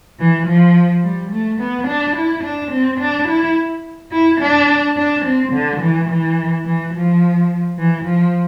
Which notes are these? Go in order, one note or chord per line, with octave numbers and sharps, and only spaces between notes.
E3
F3
G3
A3
B3
D4
E4
D4
C4
D4
E4
E4
D4
D4
C4
D3
E3
E3
E3
F3
E3
F3